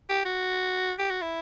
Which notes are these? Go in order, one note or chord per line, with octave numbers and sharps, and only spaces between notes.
G4
F#4
G4
F#4
E4